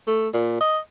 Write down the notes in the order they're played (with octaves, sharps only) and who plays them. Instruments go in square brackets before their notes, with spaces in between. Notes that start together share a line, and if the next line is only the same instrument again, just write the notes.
[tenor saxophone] A3
A#2
D#5